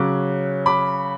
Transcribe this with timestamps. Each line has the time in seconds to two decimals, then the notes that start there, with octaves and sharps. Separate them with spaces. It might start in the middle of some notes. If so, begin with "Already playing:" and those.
Already playing: C#3 F#3 C#4 D6 F#6
0.66 B5 D6